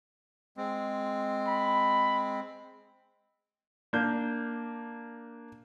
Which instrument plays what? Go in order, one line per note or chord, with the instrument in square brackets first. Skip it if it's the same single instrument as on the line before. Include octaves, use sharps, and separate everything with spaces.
[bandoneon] G#3 C4
[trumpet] B5
[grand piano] A#3 D4 G6